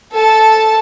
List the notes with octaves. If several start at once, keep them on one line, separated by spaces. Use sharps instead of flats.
A4 A5